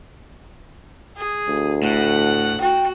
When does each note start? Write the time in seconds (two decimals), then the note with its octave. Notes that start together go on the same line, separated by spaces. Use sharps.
1.17 G#4
1.48 D2
1.83 A2 F#5
2.61 F#4 G5